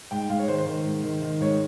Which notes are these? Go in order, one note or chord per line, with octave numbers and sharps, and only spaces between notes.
G#2 G5
G#2 F5
C#5
D#3 C5
C5
D#3
G#2
D#3
D#3
G#2 C#5